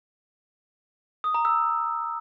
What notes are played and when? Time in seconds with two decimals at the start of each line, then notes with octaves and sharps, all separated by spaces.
1.24 D#6
1.34 A#5
1.45 E6